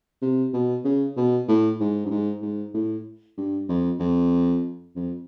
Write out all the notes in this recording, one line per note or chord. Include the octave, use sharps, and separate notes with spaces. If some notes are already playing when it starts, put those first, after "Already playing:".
C3
B2
C#3
B2
A2
G#2
G2
G#2
G#2
A2
G2
F2
F2
F2